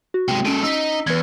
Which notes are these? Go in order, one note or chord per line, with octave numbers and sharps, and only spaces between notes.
F#4
C3 G#3 G5
G#3 C#4 A4 D7 D#7
D#4 E6 B6
E2 B4 G#6